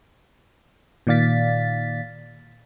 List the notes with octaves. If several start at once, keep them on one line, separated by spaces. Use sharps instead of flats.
A#2 D#3 D5 F5 A6 B6